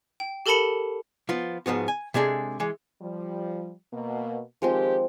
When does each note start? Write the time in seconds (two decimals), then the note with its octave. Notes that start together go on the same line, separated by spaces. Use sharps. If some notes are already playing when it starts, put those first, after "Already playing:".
0.20 G5
0.46 G4 A4 A#4 A5 B5 C#7
1.29 F3 B3 F4
1.66 G#2 F3 B3 F#4
1.88 G#5
2.14 C3 G#3 D4 G#4 A4
2.60 E3 G#3
3.00 F3 G3
3.92 B2 A#3
4.62 D#3 F3 G#3 C4 G4